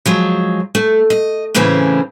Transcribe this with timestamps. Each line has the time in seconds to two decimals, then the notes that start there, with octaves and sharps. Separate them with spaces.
0.06 F3 F#3 G#3
0.75 A3
1.10 D#5
1.54 F#2 A2 C#3 E3 C4 C#4